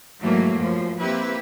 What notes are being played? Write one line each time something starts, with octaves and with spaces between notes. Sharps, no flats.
G#2 E3 F#3 A3 A#3
F#2 A2 F3
A#3 C4 E4 G4 B4